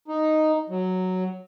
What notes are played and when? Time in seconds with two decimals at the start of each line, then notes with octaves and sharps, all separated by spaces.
0.08 D#4
0.70 F#3